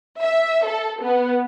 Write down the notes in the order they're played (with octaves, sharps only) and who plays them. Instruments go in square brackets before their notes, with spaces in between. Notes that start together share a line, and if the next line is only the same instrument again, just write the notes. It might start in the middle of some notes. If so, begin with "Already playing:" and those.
[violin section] E5
A4
B3